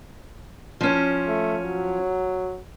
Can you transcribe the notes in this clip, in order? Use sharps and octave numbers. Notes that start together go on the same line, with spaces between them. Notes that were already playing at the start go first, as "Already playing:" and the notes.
F3 C#4
A3
F#3